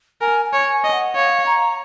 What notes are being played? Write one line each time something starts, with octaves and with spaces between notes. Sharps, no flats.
A#4 G#5
G#5
C#5
G#5
D#5
F#5
C#5 F5
A#5